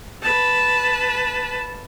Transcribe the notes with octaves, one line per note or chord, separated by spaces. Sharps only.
B4 A5